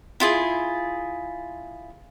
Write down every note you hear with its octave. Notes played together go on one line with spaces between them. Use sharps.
E4 F4 G#4